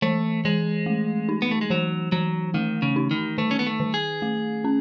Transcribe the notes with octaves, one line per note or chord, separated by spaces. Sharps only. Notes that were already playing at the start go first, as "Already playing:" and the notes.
E3 A3
E3 G#3
A3
D#4
B3
A3
G#3
E3 F#3
E3 F#3
D#3 A3
C#3
D#4
D#3
D#3 A3
C#4
B3
A3
D#3
G#4
A3
C#4